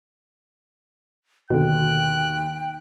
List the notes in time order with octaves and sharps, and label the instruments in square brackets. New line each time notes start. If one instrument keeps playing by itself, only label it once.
[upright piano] D#2 [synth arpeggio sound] B2 D3 [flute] G5 [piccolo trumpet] F#6